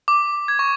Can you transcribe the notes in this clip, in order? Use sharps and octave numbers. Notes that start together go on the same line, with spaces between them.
D6
G#6
C#6